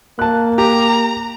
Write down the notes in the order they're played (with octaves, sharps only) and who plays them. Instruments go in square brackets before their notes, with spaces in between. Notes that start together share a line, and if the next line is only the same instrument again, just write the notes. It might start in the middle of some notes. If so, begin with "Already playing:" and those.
[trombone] A#3 [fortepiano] A5 F#6
[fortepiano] G4 [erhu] A#5